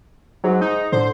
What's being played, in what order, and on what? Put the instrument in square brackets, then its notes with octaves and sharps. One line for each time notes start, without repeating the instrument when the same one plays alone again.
[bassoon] G#2 [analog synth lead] F#3
[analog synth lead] D#4
[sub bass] A2 [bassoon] D3 [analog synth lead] C5